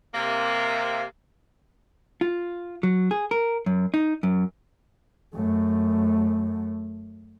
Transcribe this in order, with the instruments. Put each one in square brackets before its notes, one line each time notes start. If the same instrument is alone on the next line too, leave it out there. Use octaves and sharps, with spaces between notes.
[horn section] C3 A#3
[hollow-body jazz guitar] F4
F#3
G#4
A#4
F#2
D#4
F#2
[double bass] F#2 A3